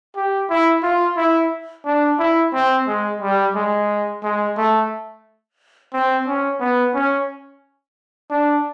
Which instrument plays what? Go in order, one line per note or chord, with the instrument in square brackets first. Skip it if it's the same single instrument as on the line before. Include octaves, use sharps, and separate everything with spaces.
[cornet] G4
E4
F4
E4
D4
E4
C4
G#3
G3
G#3
G#3
A3
C4
C#4
B3
C#4
D4